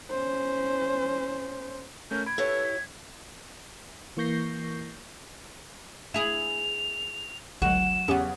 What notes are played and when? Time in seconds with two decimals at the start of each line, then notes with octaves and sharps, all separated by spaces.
0.11 C#4 C5
2.11 A3 C#4 A#4 G6
2.26 B5 G#6 D7
2.38 E4 G4 A4 B4 C#5
2.65 B6
4.17 E3 A#3 C#6 G6 A#6 C7
6.14 E4 G#4 F7
7.62 G1 C#2 F#3 F#4 E7
8.08 E2 C#3 B3 C#4 G4